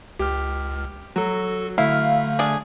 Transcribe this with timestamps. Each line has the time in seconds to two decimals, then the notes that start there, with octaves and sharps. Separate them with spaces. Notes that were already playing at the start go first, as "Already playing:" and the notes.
0.19 C#2 G4 F6
1.16 F#3 F#4 A4
1.78 D3 A3 E4 F5
2.39 D4 G#4